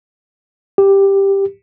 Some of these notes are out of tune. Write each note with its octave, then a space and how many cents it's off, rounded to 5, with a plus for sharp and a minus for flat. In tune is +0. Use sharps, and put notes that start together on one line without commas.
G4 +5